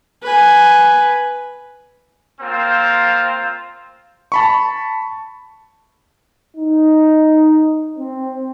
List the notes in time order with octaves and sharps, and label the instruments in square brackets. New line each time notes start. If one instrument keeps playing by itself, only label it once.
[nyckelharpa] B4 G#5
[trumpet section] A#3 C4 F4 C5
[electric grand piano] A5 B5 C#6
[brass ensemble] D#4
C4